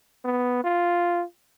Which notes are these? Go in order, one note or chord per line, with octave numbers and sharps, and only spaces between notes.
B3
F4